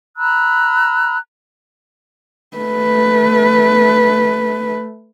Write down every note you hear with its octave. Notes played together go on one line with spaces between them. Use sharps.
A#5 B5 E6 F#6
A3 B4